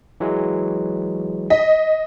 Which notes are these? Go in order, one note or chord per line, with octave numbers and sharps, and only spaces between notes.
E3 F#3 G#3
D#5 B6